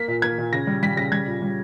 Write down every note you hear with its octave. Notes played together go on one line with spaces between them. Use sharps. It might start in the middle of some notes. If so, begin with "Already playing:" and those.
Already playing: A#3 B6
A#2
A#3 G#6
A#2
C#3 A#6
G3
G3 B6
C#3 A#6
G3 G#6
A#2
G3